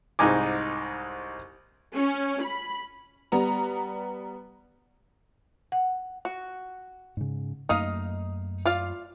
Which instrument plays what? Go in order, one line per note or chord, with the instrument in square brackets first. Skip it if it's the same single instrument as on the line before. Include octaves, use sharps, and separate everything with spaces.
[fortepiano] C2 G#2 D#4 G#5 D6
[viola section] C#4
B5
[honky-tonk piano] G3 B3 A#5
[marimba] F#5
[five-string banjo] F#4
[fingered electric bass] G#2 C#3
[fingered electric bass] F#2 A3 A#3 [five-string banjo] D#4 D#5 F5
[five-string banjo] F4 D5 F5